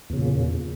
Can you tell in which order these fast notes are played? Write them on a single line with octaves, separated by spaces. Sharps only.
E2 C#3 A#2